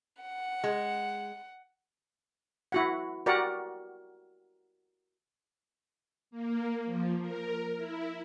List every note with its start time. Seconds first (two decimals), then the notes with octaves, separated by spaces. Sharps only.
0.22 F#5
0.64 G#3
2.72 E4 F#4 F#5
3.26 F#4 G4 A#4 D5 F#5
6.31 A#3
6.85 F3
7.20 A#4
7.77 E4